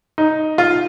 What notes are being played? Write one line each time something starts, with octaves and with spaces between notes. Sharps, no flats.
D#4
F4